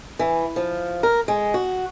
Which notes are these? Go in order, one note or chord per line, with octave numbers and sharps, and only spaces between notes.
E3
F3
A#4
G#3
F#4